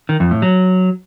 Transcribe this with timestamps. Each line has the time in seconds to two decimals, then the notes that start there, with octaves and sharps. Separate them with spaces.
0.09 D#3
0.20 F2
0.31 A2
0.42 F#3